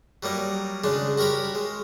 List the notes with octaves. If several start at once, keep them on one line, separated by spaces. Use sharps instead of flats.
F#3 G3 A#3 D#4
C#3 G#3 D4
F#4 G4 A#4 C#5 B5
G#3